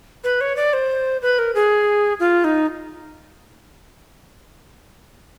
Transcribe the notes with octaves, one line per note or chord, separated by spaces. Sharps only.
B4
C#5
D5
C5
B4
A#4
G#4
F4
D#4